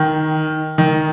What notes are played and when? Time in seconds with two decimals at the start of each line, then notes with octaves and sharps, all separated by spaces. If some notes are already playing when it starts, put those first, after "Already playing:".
Already playing: D#3
0.78 D#3